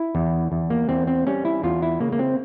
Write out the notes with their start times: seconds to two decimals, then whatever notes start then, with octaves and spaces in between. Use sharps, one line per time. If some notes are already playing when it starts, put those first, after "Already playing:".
Already playing: E4
0.15 E2
0.52 E2
0.70 A#3
0.89 E2 C4
1.07 C4
1.27 G3 C#4
1.45 E4
1.63 E2 F4
1.82 E4
2.00 C#3 A#3
2.12 A#3
2.19 C4